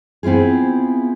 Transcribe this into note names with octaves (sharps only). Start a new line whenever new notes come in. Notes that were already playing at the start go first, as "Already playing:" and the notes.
B3 C4 E4 F4 G#4